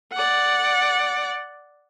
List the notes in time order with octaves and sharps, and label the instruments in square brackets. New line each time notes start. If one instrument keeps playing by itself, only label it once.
[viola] D5 F#5